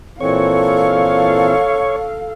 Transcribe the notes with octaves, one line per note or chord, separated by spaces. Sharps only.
A#2 E3 C4 A4 C#5 F5